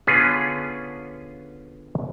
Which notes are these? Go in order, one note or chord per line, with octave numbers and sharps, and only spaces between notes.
D3 B3 C#4 F4 G#4 B4